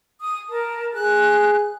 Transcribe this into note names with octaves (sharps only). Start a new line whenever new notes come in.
D#6
A#4 A5
G#4 F#6